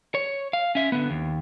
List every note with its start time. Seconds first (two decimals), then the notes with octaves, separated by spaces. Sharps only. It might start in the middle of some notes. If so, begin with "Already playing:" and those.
0.15 C#5
0.53 F5
0.75 C#4 E5
0.92 D3 B3
1.10 D#2